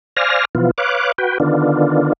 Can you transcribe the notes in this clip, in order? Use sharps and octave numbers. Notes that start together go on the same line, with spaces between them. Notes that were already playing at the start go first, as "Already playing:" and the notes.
C5 D5 F5 G#5 F6 A#6
B2 E3 F3 B3 F4
B4 C#5 F5 D6 F#6
F#4 B4 G5
D3 D#3 B3 D4 F4